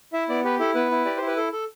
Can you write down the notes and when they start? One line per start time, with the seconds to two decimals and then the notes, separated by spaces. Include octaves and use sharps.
0.13 E4 E5
0.29 B3 D5
0.44 G4 B4
0.60 E4 A4
0.75 B3 B4
0.91 E4
1.05 G4 D5
1.16 E4 C5
1.27 B4
1.37 A4
1.52 A4